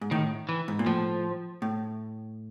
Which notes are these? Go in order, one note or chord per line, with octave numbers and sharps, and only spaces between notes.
G#2
A2 D#3
E3
G#2
A#2
A2 F3
A2